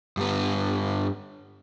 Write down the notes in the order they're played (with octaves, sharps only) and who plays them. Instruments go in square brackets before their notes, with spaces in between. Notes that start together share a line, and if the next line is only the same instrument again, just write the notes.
[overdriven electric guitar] G2 B3